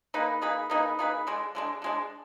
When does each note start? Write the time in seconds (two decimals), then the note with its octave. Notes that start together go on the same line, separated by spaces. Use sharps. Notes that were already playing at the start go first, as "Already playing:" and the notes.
0.14 A#3 D#4 G#4 B4
0.42 A#3 D#4 G#4 B4
0.70 A#3 D#4 G#4 B4
0.99 A#3 D#4 G#4 B4
1.27 D3 G#3 D4
1.55 D3 G#3 D4
1.82 D3 G#3 D4